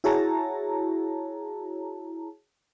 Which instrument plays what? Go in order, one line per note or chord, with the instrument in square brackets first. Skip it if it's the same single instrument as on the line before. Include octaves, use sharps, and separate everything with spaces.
[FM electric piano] E4 F#4 G#4 C#5 A5 A#5